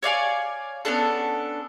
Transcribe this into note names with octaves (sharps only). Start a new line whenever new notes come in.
C#5 D5 F5 G#5
B3 C#4 D4 A4